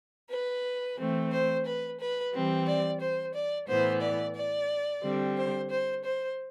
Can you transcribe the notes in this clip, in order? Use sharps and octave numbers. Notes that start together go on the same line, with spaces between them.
B4
E3 A3 C4
C5
B4
B4
E3 G3 C4
D5
C5
D5
A2 E3 B3 C5
D5
D5
D3 G3 C4
C5
C5
C5